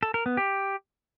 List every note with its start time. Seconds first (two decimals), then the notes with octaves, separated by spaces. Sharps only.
0.03 A4
0.14 A#4
0.26 B3
0.37 G4